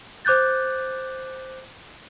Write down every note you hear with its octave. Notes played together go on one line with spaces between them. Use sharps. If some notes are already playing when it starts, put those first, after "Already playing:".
C5 D6 F#6 G6 A6